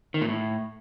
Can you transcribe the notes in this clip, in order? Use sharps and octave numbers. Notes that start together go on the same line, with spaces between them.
D#3
A#2
A2